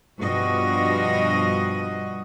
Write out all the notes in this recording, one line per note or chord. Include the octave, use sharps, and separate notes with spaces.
G2 B2 F3 G3 F#4 D#5